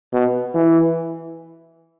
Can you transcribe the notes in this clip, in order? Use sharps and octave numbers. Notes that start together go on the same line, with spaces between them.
B2
E3